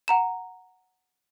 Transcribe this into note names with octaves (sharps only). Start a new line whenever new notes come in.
F#5 A#5 E7